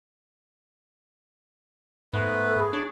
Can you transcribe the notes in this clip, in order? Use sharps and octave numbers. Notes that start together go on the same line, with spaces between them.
G#2 A3 B3 B4
A4
G#4
D4 C#5